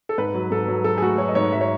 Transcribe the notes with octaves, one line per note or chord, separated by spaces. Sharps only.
A4
G#2 B4
F#3
G#2 A4
F#3
F#3 A4
G#4
A3 F#4
F#3 C#5
D#5
G#2 C#5
F#3 E5
C#5